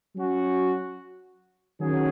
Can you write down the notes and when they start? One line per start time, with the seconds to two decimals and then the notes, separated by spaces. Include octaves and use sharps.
0.16 F#3 C#4 F#4
1.79 D#3 F#3 C#4 G#4